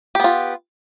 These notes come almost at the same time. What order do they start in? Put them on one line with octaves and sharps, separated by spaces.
G4 B3 F4